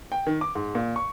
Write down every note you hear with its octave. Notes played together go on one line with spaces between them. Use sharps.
G5
D#3
D6
G#2
A#2
C#6